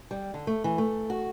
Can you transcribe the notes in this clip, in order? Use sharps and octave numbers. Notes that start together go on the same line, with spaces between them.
G3
D3
A3
E3
A3
F#4